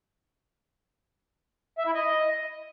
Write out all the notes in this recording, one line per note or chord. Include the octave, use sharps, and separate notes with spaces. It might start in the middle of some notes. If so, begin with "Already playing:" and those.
E5
E4
D#5